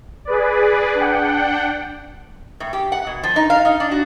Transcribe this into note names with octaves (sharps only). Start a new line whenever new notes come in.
G#4 B4 D5
D4 F#5 G5
A2
G4
F#5
B2
F3
D#4
F5
D#4
D4
F#4